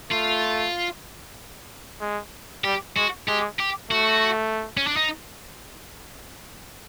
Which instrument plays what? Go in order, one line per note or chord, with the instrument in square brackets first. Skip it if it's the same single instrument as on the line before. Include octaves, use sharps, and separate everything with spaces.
[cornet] A3 [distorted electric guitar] F4
[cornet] G#3
[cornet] G3 [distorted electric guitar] G4
[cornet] G#3 [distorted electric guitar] F#4
[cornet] G#3 [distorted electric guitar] G4
[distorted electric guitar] G4
[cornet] A3 [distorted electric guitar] F#4
[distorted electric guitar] C#4
D4
D#4